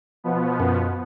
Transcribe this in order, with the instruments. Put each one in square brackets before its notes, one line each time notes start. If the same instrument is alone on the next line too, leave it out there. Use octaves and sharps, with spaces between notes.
[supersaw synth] B2 F3 B3
[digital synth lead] F#2